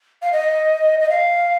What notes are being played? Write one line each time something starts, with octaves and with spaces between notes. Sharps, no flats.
F5
D#5
D#5
F5